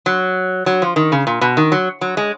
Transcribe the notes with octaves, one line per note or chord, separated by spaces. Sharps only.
F#3
F#3
F3
D#3
C#3
A#2
B2
D#3
F#3
F#3
G#3